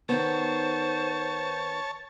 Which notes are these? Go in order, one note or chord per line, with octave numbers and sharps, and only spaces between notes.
D#3 B3 C5 C#5 A5